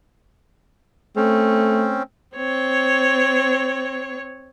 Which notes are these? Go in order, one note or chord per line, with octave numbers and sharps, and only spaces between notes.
A3 C4 C#4
C4 C#5